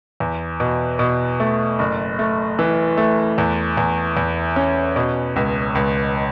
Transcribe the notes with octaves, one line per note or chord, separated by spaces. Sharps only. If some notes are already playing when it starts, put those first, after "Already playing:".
E2
B2
B2
A3
F#1
A3
E3
A3
E2
E2
E2
C#4
B2
C#2
C#2